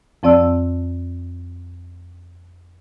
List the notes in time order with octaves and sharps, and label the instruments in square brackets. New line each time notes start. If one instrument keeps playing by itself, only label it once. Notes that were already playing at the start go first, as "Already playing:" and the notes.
[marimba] F2 F3 C4 D5 A5 E6